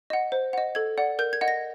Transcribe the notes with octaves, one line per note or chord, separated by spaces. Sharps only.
D#5 F#5
C5
D#5 F#5
A4 G#6
D5 F#5
A#4 G6
G#6
D#5 F#5
A#6